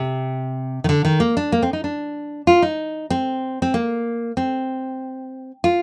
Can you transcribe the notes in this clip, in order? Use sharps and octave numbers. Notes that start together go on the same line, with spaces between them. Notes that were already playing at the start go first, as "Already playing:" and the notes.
Already playing: C3
D#3
D3
D#3
A#3
D4
A#3
C4
D#4
D4
F4
D#4
C4
C4
A#3
C4
F4